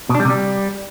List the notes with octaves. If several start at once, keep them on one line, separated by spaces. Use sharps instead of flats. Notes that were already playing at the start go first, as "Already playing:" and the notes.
B2
D4
G3
C3
G3